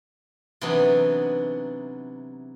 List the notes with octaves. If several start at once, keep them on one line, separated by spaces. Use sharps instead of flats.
C3 E3 F#3 B3 D4 D#4